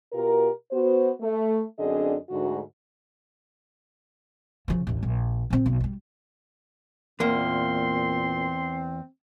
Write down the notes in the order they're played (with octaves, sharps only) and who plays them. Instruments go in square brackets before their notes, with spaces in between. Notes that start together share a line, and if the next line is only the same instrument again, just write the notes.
[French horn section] B2 F4 G4 A#4
B3 F#4 C5
A3
F#2 D3 C4 D4 G#4 D#5
D2 G#2 F#4
[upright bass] C#3 F3
A1 D#2
A#1
A#2 C4
B1
F3 G3
[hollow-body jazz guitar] E2 A#3 [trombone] A#2 [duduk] C4 [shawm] C6